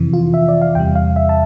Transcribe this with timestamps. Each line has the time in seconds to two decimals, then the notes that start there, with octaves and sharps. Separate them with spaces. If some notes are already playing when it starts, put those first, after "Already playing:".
Already playing: F2 C3 E3
0.13 F4
0.34 E5
0.48 D5
0.62 F5
0.75 E2 C3 G3 G5
0.95 F5
1.16 E5
1.29 A5